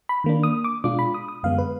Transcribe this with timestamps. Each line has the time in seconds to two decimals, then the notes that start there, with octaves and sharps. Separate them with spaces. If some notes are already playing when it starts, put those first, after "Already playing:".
0.09 B5
0.24 D#3 A#3 D4
0.43 D#6
0.64 D6
0.84 B2 G#3 D4 F4 D6
0.99 B5
1.14 D#6
1.28 D#6
1.43 F#2 D3 G#3 B3 F5
1.58 B4